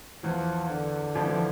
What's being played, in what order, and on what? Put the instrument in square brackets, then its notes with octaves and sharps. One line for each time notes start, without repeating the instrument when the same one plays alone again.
[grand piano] E2 E3 [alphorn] F3
[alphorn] D3
[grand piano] F2 F3
E3
F3